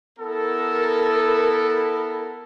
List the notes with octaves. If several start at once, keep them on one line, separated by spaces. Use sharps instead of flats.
B3 E4 A4 A#4